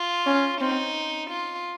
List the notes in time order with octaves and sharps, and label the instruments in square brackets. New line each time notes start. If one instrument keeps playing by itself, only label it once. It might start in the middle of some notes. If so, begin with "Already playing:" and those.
Already playing: [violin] F4
[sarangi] C#4
[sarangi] C4 [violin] D#4
[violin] F4